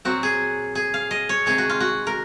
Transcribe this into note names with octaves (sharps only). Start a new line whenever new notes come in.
A#2 F#3 C4 F#4
G#4
G#4
F5
D#5
C#5
C3 D#3 G#3 G#4
F#4
F4
F#4
A#4